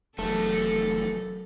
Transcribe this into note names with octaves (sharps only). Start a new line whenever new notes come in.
F1 E2 F#3 A3 A4 A#4 A5